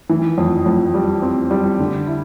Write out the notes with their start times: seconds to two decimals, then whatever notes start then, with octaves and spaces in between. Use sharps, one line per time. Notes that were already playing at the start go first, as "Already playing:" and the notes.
0.09 E3
0.38 F2
0.66 F2
0.94 G3
1.22 C4
1.51 G3
1.80 D3
2.07 E4